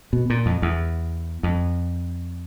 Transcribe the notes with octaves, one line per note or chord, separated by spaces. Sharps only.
B2
A#2
F2
E2
F2